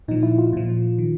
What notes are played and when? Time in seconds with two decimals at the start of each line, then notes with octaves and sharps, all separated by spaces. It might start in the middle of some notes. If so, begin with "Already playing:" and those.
0.08 A#2 F3 D#4
0.23 E4
0.38 F4
0.53 A#2 F3
0.98 D#3